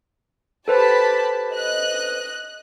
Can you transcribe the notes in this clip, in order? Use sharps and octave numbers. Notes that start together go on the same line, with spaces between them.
G4 A4 B4 C5 A5 B5
D#5 F#6